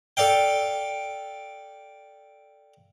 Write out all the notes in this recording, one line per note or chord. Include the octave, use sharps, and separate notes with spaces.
A4 D5 F5 G5